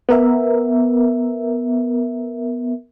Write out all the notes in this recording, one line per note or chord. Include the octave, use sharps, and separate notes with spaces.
B3 A#4 E5